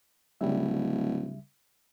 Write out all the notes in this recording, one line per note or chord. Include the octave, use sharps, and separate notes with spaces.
D1 C#3 G3 E5